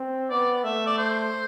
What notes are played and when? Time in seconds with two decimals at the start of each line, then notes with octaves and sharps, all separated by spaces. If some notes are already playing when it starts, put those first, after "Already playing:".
Already playing: C4
0.30 B3 D5
0.64 A3 E5
0.87 D5
0.98 C5